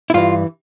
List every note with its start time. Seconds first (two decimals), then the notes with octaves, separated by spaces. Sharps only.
0.10 E4
0.14 G2 E3 F4